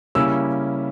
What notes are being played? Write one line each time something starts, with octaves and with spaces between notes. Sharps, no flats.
C#3 G3 A#3 C#4 E4 E6